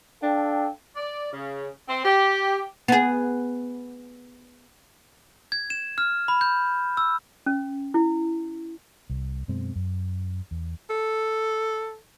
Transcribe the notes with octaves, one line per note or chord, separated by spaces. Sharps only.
D4 A4 F5 G5
D5
C#3
C4
G4
B3 G#4
G#6
E7
F6
B5
G6
E6
C#4
E4
C2
F#2 B2 G#3 C4
F#2
E2
A4